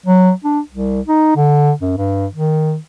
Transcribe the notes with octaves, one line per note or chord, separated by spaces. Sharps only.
F#3
D4
C2
D#4
D3
F#2
G2
D#3